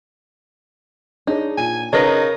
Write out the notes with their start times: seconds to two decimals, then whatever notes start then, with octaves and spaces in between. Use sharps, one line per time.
1.27 D4 D#4 G#4 C#5
1.57 A#2 G#5 D#7
1.93 C#3 D#4 A#4 B4 C#5 D#5 A#6